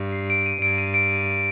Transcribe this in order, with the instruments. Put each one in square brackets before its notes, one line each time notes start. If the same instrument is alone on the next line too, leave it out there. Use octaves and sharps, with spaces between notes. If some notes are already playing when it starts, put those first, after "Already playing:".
Already playing: [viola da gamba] G2
[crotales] C7
D7
D#7
[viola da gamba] G2 [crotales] D7
[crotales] D#7
D7